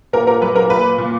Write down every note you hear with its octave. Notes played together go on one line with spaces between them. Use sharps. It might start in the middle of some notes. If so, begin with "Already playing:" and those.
A#2 A#4
A#4
F#3 B4
A#4
A#2 B4
A#2